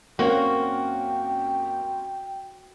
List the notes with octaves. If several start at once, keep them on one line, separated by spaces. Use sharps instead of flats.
F#2 A#3 C4 C#4 F#4 G5